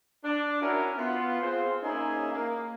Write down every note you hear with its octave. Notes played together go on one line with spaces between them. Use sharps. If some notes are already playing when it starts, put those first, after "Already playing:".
D4
C#4 E4 F#4 A#4
B3 F4
C4 F4 G#4 C5
A#3 C#4 D#4 E4 G#4
A#3